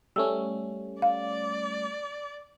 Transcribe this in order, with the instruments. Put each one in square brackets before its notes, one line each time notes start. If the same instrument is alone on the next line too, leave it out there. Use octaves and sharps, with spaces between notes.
[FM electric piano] G3 A3 C#4 [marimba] E6
[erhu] D5 [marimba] F5